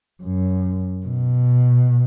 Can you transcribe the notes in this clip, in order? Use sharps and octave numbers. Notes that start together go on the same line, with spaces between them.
F#2
B2